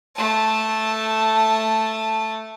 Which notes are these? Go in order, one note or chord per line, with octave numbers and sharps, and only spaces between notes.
A3 A5